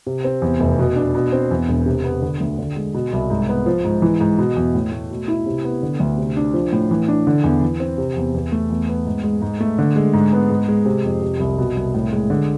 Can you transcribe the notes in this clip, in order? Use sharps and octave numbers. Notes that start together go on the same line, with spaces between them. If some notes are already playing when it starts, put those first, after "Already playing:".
C3
C4
E2
F1
B2
D4
B2
C4
E2
E1
C3
B3
D3
D2
D3
G#3
B2
C2
G#2
B3
F3
G#2
E3
G#2
B2
E2
A2
A3
B2
E4
C3
B3
D3
D2
C3
D4
F3
A2
E3
D4
D3
E2
E3
C4
C3
E2
E2
A3
E2
B3
G#2
G#3
G#2
A3
D3
G#3
G#2
B3
G#2
G#3
C3
F2
C3
C2
B2
C2
A2
G#3
D3